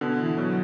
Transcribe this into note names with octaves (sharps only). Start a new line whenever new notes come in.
B2 D3 B3
E3
B2 D3 F#3